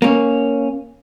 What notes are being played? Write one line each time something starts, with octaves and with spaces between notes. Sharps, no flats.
A#3 C#4